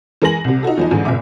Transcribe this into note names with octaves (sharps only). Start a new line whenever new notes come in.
E3 G#3 A#4 G#5 A#6 F#7
C2 C3
D#4 F4 F#4 A4
E2 F3 D#4
A1 G#2 D3 E3
F#1 A#2 E5 D6